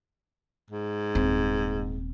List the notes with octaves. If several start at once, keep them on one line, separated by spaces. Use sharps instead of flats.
G#2
D#1 C4